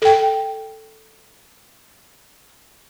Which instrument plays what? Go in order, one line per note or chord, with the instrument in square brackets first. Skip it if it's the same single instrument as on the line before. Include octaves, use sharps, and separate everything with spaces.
[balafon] A4 G5